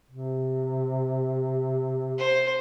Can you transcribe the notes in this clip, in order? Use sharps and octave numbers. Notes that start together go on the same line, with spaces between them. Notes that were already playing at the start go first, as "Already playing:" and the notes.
C3
C5